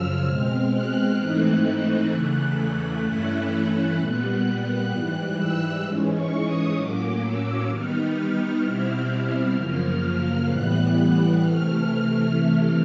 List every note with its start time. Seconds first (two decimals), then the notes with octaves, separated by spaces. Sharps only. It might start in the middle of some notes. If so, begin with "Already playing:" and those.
Already playing: F#2 C#3 F3 E6 F6
0.26 B2 G#3 C4 F6
0.73 F#6
1.19 G#2 E3 A3 C4 D#4
2.12 E2 C#3 E3 A3
3.04 G2 E3 A3 C#4 E4 F#6
3.98 A#2 G3 B3
4.90 G#2 E3 G3 F#6
5.36 E6
5.83 G#2 E3 G#3 C#4
6.14 C#6
6.44 D#6
6.75 A2 F#3 A#3 C#4 D6
7.22 E6
7.68 D#3 G3 B3 D#4 F6
8.15 F6
8.62 B2 G3 C4 E4
9.54 F#2 C#3 F3 A#3
10.46 A2 E3 G3 B3 F#6
10.93 F#6
11.40 C3 E3 A3 F6